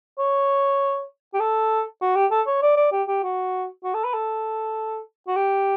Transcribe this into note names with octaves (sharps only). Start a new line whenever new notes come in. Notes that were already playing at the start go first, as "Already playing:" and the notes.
C#5
G4
A4
F#4
G4
A4
C#5
D5
D5
G4
G4
F#4
F#4
A4
B4
A4
F#4
G4